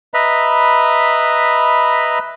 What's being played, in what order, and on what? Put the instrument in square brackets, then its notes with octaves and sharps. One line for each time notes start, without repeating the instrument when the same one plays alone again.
[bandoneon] B4 D#5 E5 A#5 B5